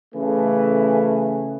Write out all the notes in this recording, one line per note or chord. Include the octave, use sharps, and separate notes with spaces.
C#3 E3 A3